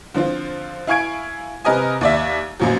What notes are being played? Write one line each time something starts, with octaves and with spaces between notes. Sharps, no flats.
D3 F3 C4 F4
E4 F5 G#5 C#6 G#6 D7
C3 A#4 B4 D#5 G#5
D#2 D5 E5
A1 F#2 A#2 F3 F#3